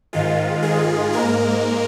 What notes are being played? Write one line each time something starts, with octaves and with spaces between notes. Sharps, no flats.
G#2 D#3 G#3 F4
G#3 G#4
G#2 G#3 A#3 A#4